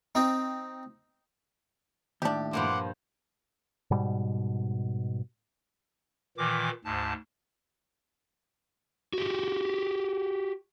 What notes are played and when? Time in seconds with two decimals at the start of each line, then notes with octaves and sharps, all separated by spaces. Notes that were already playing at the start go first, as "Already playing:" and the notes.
0.15 C4 D#4
2.22 D#2 A2 D4 G4
2.53 G2 A#2 F3 F#5 C6 D6
3.91 G#2 B2 G3
6.37 A#2 D#3 E3 D6
6.85 D2 G#2 A5
9.13 F#4 G4